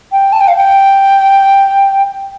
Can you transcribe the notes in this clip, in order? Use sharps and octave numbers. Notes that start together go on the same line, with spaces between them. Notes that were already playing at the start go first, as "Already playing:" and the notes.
G5
A5
G5
F5
G5